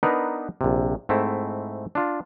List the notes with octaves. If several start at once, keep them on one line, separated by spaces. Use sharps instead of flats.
B3 D4 D#4 A#4 B4
A#1 C3
G#2 A3 C4 E4
D4 F4